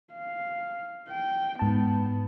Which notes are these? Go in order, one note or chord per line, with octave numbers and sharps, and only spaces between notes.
F5
G5
G#2 B3 A5